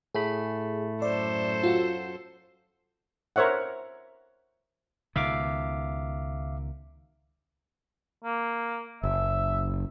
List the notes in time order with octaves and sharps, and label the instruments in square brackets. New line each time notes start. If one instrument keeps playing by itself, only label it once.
[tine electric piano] A2 A3 B5 [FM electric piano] G#4
[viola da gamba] F#2 A4 C5 [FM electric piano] D5
[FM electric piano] F4 F#4
[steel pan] A#4 C5 C#5 E5 F#5
[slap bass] C#2 B2 D#3 [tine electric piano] E5 F5 D6
[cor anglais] A#3
[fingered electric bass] F#1 [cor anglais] E5